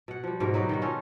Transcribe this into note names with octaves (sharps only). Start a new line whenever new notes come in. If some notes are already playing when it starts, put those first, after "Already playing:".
B2 F#5
F3 G3
G#2 B2 G4 A#4
F#3 D#4 B4 D5
D#3 G3 F#4
C#4 D#4 F4 A4